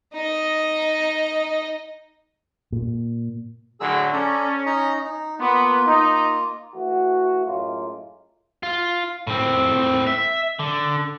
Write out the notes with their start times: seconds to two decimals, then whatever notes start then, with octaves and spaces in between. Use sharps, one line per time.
0.14 D#4 D#5
2.72 A#2
3.80 A2 D3 F#3 G#4 E6
4.13 C#4 A4 D5 A#5
4.66 D#4 D#5 A#5
5.04 D#4
5.40 A#3 B3 F4
5.87 D#4
6.75 E3 A3 F#4
7.45 F#2 A2 G#3 A#3 F4
8.63 F4
9.27 A2 C4
10.07 E5
10.59 D3